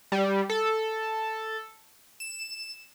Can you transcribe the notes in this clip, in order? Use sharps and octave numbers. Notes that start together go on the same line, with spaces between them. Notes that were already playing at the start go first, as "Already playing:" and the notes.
G3
A4
E7